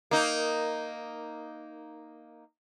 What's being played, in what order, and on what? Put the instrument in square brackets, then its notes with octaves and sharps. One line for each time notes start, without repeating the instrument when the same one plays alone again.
[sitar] A#3 D#4